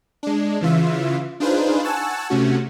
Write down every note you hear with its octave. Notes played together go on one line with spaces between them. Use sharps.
G#3 D4
C#3 E3 F4 E5
D4 D#4 F4 G#4 B4 C5
F#5 G#5 A5 C#6 E6 F#6
C3 A3 C#4 F#4